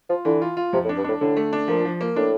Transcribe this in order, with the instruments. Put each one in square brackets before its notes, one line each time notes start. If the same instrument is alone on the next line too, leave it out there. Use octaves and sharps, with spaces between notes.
[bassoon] F3 [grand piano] F4
[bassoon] D3 [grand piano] E3
[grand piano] F4
F4
[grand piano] F2 [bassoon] C3
[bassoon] A2
[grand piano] D4
[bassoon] G2
[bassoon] A2 [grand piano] D4
[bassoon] A2 [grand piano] D3
[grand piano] A3
D4
[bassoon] A#2 [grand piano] F3
[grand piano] F3
A#3
[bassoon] A2 [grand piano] D4